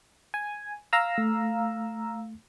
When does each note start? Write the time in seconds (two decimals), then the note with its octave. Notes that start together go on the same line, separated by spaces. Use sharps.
0.34 G#5
0.93 F5 A#5 E6
1.18 A3